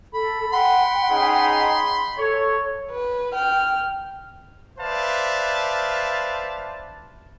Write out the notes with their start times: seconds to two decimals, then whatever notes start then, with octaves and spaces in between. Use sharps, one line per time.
0.14 A4 B5
0.53 F#5 G5 B5 C6
1.11 C#4 D#4 G#4
2.18 A4 C#5
2.91 B4
3.34 G5 F6
4.79 B4 C5 D5 E5 F5 A5